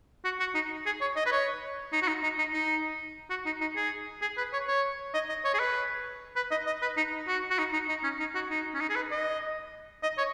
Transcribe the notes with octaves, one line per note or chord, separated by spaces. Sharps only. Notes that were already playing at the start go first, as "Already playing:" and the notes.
F#4
F#4
D#4
G#4
C#5
D#5
B4
C#5
D#4
F#4
D#4
D#4
D#4
D#4
F#4
D#4
D#4
G#4
G#4
B4
C#5
C#5
D#5
D#5
C#5
G#4
B4
B4
D#5
D#5
B4
D#4
F#4
F#4
D#4
D#4
D#4
C#4
D#4
F#4
D#4
C#4
D#4
G#4
B4
D#5
D#5
C#5